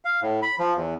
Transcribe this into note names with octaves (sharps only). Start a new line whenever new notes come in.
F5
A2
B5
F3
E2